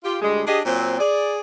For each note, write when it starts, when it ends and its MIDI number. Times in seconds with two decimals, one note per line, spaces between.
0.04 0.17 65
0.04 0.17 67
0.22 0.42 38
0.22 0.42 55
0.22 0.42 56
0.47 0.60 62
0.47 0.60 67
0.47 0.60 68
0.47 0.60 74
0.47 0.60 75
0.65 0.98 46
0.65 0.98 54
0.65 0.98 60
0.99 1.40 68
0.99 1.40 74